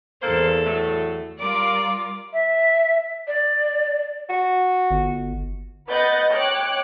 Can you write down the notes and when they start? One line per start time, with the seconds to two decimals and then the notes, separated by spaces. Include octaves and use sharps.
0.22 E2 A#3 C4 A4 C5
0.65 A2 F#3 A3
1.40 G3 F4 A#4 D5 D6
2.33 E5
3.28 D5
4.30 F#4
4.91 G1
5.88 B4 D#5 F#5 F#6 G6 A6
6.33 C#5 G5 D6 F#6